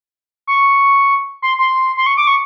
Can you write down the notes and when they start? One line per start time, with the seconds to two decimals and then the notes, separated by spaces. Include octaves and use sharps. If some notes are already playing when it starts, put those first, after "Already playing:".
0.47 C#6
1.42 C6
1.59 C6
1.97 C6
2.06 C#6
2.17 D6
2.27 C#6